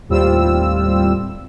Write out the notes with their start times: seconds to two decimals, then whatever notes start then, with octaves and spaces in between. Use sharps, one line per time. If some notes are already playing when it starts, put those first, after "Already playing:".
0.09 D#2 A2 G3 C4 F4 E6